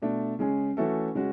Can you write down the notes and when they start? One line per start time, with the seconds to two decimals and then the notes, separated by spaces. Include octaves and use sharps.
0.02 B2 A3 D4
0.39 C#3 G#3 C#4 G#4
0.77 E3 A3 C#4 F#4 A4
1.15 C#3 G#3 C#4 F#4